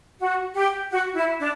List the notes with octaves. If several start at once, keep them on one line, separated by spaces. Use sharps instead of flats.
F#4
G4
F#4
E4
D4